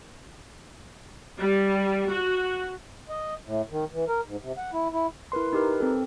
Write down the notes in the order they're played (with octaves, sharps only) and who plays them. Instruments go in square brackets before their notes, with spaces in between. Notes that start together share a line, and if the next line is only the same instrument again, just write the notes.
[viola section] G3
F#4
[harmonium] D#5
A2
D#3
E3
A#4
G#2
C3
F#5
E4
E4
[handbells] E4 A#4 B4 C6
D#4 G4 A#4 B4
C4 A4